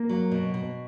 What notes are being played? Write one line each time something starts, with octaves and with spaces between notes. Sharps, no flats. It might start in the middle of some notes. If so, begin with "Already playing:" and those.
Already playing: A#3
F#3
B2
B2